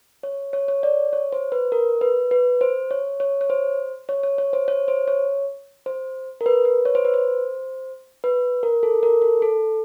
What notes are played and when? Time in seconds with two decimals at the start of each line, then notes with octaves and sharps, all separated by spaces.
0.23 C#5
0.53 C#5
0.68 C#5
0.83 D5
1.13 C#5
1.33 C5
1.52 B4
1.72 A#4
2.01 B4
2.31 B4
2.61 C5
2.91 C#5
3.20 C#5
3.41 C#5
3.50 C5
4.09 C#5
4.23 C#5
4.38 C#5
4.53 C5
4.68 C#5
4.88 C5
5.08 C#5
5.86 C5
6.41 A#4
6.46 B4
6.65 B4
6.85 C#5
6.95 C5
7.05 B4
7.14 C5
8.24 B4
8.63 A#4
8.83 A4
9.03 A#4
9.22 A4
9.42 A4